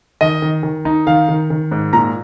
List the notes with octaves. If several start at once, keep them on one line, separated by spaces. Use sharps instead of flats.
D#3 D#5
D#3
D#3
D#4
D#3 F5
D#3
D#3
G#2
A#2 A#5